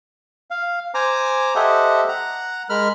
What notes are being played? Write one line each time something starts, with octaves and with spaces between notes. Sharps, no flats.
F5
C5 G#5 A#5 D6
G4 A4 C5 D#5 E5 F#5
F#5 A#5
G#3 A#4 B5 F6